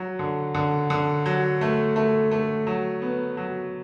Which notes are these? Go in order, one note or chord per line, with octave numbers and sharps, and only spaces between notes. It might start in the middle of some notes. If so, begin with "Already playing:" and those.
Already playing: F#3
D3
D3
D3
F#3
A3
A3
A3
F#3
B3
F#3